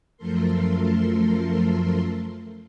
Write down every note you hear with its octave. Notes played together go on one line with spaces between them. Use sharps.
F#2 F3 A3 A4 A#4 C6